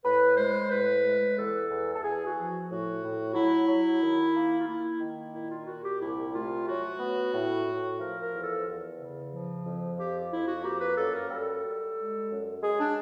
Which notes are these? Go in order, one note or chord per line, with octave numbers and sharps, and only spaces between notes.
A2 B4
G#3 C5
A2 B4
G#3
E2 A4
E2
A4
E2 G#4
F#4
F3
A2 F#4
A2
F#3 E4
F#3
D#3
A#3
F4
A#3 E4
D#3
A#2 E4
F4
A#2 F#4
G4
C2 E4
A3 F4
F#3 F#4
B3
A2
A2
F3 A#4
A#4
E2
A4
E2
C#3
F3
F2
F3 G4
F2 E4
F#4
A#3 G4
B4
F#2 A4
A#4
G3 A4
G3
G#3
F#2
G#3 G#4
D4